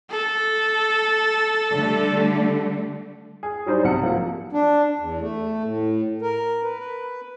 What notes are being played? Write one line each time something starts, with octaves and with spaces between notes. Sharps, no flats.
A4
D3 G3 A3
G#4
F#3 G3 D#4 C5 D5
B1 C3 F#5 C#7
F3 A#3
D4
E2
A3
A2
A#4
B4
B4